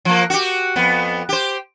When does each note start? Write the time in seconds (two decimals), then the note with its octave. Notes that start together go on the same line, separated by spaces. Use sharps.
0.05 F3 A#3
0.30 F#4 G4
0.76 F2 B3
1.29 G4 C5